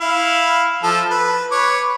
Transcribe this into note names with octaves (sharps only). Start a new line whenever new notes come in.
E4 F5
F3 A4
B4
B4 C#5 D6